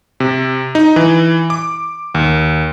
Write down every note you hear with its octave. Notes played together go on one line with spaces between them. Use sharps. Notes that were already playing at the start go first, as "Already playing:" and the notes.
C3
D#4
E3
D6
D#2